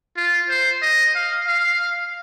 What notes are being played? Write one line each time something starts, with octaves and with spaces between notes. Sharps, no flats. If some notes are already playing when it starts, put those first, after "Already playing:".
F4
C5
D#5
F5
F5